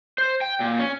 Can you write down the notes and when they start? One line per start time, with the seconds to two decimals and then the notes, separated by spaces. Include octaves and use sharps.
0.18 C5
0.41 G5
0.60 A#2
0.79 C#4